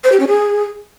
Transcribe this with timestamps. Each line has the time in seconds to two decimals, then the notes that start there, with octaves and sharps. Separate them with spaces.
0.04 C5
0.12 G4
0.20 C#4
0.28 G#4